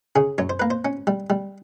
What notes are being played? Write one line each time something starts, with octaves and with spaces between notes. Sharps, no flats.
C#3 G#4
F#2 C#5
C5
A#3 B4
C5
C#4
G3
G3